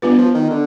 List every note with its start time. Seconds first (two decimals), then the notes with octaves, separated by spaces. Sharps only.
0.02 G2 B3 F4 B4
0.18 F3
0.35 D#3
0.50 D3